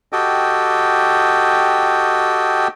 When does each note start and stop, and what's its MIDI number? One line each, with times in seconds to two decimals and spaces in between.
0.13 2.68 66
0.13 2.68 67
0.13 2.68 69
0.13 2.68 75
0.13 2.68 79